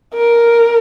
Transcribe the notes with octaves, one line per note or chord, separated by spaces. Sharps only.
A#4